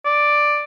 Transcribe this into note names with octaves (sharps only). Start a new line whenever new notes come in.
D5